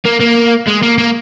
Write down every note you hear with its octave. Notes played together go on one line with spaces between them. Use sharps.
A#3
A#3
G#3
A#3
A#3